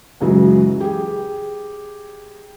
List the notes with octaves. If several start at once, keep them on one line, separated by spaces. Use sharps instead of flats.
C#2 F#2 C#3 E3 F#3 G#3
G4 G#4